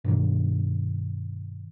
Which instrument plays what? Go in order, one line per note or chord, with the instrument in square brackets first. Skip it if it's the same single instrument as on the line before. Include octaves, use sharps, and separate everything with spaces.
[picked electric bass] G2 B2 D#3